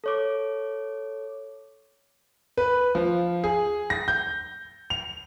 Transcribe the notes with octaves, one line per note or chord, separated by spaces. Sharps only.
A4 C#5 D6
B4
F3
G#4
A#6
G6
F7